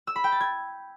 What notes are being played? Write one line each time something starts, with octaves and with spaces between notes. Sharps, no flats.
E6
B5
G5
A6
G#6